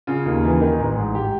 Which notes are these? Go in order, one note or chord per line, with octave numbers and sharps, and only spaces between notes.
C#3 F4
D#2
E3
D#3
A1
G#2
G4